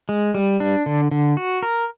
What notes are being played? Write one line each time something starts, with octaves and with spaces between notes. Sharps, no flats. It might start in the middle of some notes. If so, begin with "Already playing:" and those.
G#3
G3
D4
D3
D3
F#4
A#4